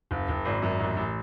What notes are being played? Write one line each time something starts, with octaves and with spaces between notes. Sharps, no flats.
F#1
F#1
G#1
F#2
A1
A1